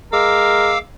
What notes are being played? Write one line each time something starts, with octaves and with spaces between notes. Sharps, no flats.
G#3 A#4 F5 D6 E6